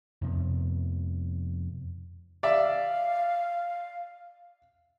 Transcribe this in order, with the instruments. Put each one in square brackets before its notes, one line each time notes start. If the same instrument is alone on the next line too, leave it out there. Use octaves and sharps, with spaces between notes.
[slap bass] F2 C3 B3
[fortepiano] D5 E5 [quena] F5